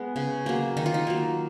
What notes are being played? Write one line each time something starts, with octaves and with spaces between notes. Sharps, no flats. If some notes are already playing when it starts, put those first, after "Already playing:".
Already playing: G#3 B3
C#3
F#3 A#3
D#3 D#4
F4
D#4
F#3 A#3